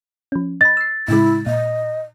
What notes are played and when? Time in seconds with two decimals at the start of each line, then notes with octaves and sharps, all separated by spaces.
0.32 F3 C#4
0.61 D#5 B5 A6
0.77 E6 C7
1.08 A2 C#3 G#3 E4
1.46 A#2 D#5